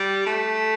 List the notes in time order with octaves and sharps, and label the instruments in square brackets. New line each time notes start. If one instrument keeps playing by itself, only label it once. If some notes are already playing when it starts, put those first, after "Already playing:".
Already playing: [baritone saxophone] G3
A3